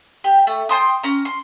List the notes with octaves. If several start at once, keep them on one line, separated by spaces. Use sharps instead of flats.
G4
A3
G5 A5 C6 D#6
C#4 A#5
C6